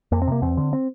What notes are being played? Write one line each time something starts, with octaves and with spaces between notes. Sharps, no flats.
F2 A#3
C4
C3 A#3
E2 C4
D3
C4